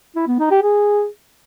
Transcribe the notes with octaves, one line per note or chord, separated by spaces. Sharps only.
E4
B3
D#4
G4
G#4